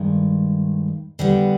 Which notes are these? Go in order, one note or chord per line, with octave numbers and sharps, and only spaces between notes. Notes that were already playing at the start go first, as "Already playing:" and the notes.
Already playing: G2 D#3 G#3
D3 G3 B3